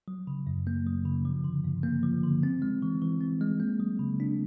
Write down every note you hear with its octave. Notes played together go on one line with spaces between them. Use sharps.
F#3
C#3
F#2
A#3
F#3
C#3
F3
D3
G2
A#3
F3
D3
C4
G#3
E3
E3
C4
G#3
A#3
F#3
C#3
D4